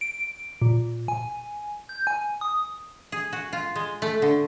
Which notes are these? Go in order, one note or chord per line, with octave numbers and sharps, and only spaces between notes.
D7
A#2
G#5
G6
G#5
D#6
G#4
F#4
F4
G#3
A3
D3